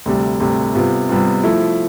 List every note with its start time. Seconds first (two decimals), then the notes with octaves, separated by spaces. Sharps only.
0.06 D2 C3 G3
0.40 D2 C3 G3
0.75 C3 G3 B3 F4
1.09 C3 G3 B3 F4
1.44 F3 A3 E4